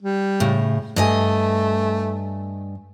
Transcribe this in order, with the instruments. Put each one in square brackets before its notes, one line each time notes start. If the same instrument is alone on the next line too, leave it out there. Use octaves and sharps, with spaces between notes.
[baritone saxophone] G3
[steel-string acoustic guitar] A2 C#3
[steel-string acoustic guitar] G2 D#5 G#5 [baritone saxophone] A3